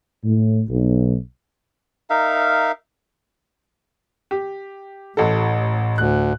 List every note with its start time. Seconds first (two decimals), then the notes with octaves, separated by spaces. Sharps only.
0.25 A2
0.69 B1
2.10 D#4 A#4 E5 F5
4.31 G4
5.17 A1 A2 A4
5.98 D2 F#6